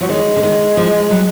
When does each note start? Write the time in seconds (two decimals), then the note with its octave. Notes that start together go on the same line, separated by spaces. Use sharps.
0.01 F3 F#3
0.09 D#3 G#3
0.36 D3
0.43 D#3
0.77 F3
1.10 F#3